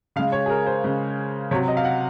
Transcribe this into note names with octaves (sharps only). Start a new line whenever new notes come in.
C#3 G#3 F5
C#5
G#4
A#4
C5
C#3 G#3
C3 F#3 C#5
D#5
F5
F#5